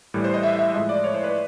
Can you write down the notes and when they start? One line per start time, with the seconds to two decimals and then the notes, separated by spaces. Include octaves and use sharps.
0.14 A2 E3 G3
0.24 C5
0.34 D#5
0.43 E5
0.59 E5
0.74 A2 F3 G#3 D#5
0.89 D5
1.04 C#5
1.14 C5
1.24 B4